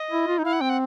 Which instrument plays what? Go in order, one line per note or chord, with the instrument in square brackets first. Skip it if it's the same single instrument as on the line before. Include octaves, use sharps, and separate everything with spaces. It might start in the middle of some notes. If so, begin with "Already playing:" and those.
Already playing: [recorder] D#5
[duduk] E4
F4
D#4
[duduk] E4 [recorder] F5
[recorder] F#5
[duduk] C4 [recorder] G5
[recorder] F#5